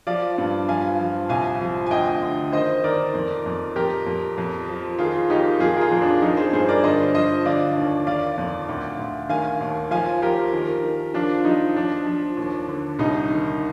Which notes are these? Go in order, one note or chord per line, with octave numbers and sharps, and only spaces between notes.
F3 D5 F5
G2
F3 F5 G#5
F3
C2 F5 G#5
F3
G#5
D2 D#5 G5
D3
D#3 C5 D#5
D#3 A#4 D5
F2
F2
F2 G4 A#4
F2
F2
F3
D#3 F4 G#4
D#3 D#4 G4
F2 F4 G#4
A#4
F4 G#4
F2
D4
F3 D#4
G#4 C5
G2 G#4 C5
A#4 D5
D3 C5 D#5
F3 C5 D#5
D3 D5 F5
D#2
D#3 D5 F5
F2
D2
D2
D#3 F5 G#5
D#2
F3 F5 G#5
F3 G4 A#4
D#3
D#3
F3 D4 F4
F3 D#4
F3 D4
F3
D#2
D3
C2 D#4
D#3